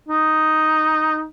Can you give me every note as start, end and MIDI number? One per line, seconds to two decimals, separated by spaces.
0.09 1.24 63